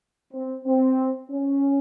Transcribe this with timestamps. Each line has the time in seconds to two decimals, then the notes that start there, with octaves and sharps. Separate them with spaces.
0.33 C4
0.65 C4
1.30 C#4